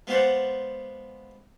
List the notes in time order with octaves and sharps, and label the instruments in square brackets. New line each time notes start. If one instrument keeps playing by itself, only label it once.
[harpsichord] G#3 B3 F4 C5 D5 F#5